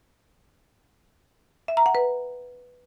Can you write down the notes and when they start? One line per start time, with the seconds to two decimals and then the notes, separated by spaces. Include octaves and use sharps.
1.68 E5
1.77 A#5
1.86 F#5
1.95 B4